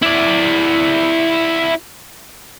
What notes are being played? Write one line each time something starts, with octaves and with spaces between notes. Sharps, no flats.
E4 D5